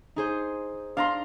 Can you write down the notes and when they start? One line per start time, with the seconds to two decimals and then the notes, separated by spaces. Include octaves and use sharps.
0.16 D#4 G#4 C5
0.97 D4 F5 A#5 C6